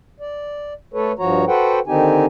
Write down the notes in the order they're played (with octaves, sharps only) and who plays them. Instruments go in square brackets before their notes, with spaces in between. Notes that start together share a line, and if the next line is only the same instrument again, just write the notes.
[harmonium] D5
A3 A4 B4 C#5
G2 F3 F#4 C#5 A#5
F#4 A4 B4 C5 F#5 G5
D3 D#3 C4 D#4 G4 G#5